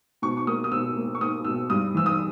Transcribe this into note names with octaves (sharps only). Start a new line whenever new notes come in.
B2 C#6
C#6
A#3 D#6
D#6
B2 E6
A#3
C#6
A#3 D#6
B2 E6
G2 D#6
E3 E6
D#6